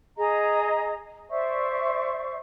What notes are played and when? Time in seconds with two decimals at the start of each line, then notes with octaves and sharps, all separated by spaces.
0.17 G#4 D#5 A#5
1.31 C5 D5 E5 C#6